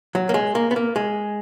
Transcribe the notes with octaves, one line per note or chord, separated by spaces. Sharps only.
F#3
A#3
G#3
A#3
B3
A#3
G#3